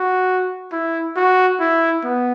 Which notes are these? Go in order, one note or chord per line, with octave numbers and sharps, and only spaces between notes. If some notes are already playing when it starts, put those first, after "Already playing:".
Already playing: F#4
E4
F#4
E4
B3